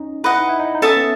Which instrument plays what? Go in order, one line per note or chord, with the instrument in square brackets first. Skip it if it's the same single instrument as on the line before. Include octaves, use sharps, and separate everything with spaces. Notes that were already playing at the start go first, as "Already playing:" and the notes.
Already playing: [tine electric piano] C#4 D#4
[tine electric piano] E4 [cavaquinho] B4 D#5 F#5
[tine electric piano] D#4
E4
D#4
D#4
[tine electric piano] C#4 [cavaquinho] A4 E5 A5 D#6
[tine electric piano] B3